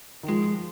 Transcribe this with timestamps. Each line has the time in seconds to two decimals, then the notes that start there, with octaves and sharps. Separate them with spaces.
0.23 D#3
0.28 F3 G#3